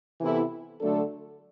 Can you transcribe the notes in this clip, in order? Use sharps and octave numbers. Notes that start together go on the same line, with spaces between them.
C3 E3 B3 E4 A4
D3 F#3 A3 D4 A4